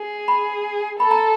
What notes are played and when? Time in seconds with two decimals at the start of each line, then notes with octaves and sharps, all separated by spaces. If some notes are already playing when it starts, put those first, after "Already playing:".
Already playing: G#4
0.28 B5
1.00 A4 B5
1.11 A#5